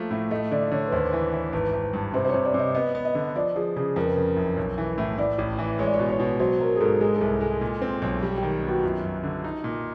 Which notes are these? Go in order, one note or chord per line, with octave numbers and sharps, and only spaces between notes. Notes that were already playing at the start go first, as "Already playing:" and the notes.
Already playing: F3 A3 A#3
A2
A3 D#5
D3 D5
D3 C#5
B4
D#2 C5
E3
E3
G#1 B4
G#1
G2
C3 C5
C5
C3 C#5
D5
C3
D#5
B3 D#5
B3
D#5
D3
F3 D5
F3 G#4
C#3 G#4
F2 A#4
B4
A#4
C#3
F#1
B1
E3
A2
A2 D5
A1
E3
G#3 C#5
D5
C#5
B2
C#5
B2
F#3 C5
F#3 A#4
G#4
G#2 A4
G#3 G#4
A4
C2 G#4
G#3 A4
A#2
C4
B1
G3
D#3 G4
B3
F#4
F#2 F4
F#2
D3
D#4
A#2